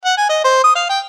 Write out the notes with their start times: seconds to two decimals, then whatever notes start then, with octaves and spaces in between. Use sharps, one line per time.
0.05 F#5
0.17 G#5
0.29 D#5
0.44 C5
0.64 D#6
0.76 F5
0.89 G5